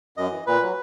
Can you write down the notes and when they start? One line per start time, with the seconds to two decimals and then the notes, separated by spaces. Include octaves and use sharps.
0.17 F#2 D#5
0.32 E3
0.47 A#2 B4
0.62 F#3